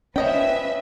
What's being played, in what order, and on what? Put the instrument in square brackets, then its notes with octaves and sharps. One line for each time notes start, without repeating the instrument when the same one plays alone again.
[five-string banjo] F3 D#5 G5 [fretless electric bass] C#4 [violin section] B4 E5